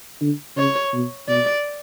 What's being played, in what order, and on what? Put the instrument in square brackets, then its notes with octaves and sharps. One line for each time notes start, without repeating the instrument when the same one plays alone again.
[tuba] D3
[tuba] C#3 [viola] C#5
[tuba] B2
[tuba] B2 [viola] D5